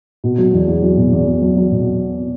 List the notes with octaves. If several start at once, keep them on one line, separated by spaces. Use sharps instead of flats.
B2
F#3
E2
E2
F#3
B2
E2
E2
F#3
F#3
B2